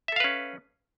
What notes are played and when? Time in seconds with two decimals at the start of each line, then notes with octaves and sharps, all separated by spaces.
0.08 E5
0.12 A4
0.16 F5
0.20 B4
0.24 C#4